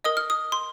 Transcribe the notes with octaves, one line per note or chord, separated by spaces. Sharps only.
A#4 D#5 D#6
F6
D#6
C6